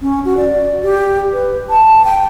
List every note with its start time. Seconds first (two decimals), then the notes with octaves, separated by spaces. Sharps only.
0.01 C#4
0.25 F#4
0.37 D5
0.83 G4
1.33 B4
1.69 A5
2.05 G5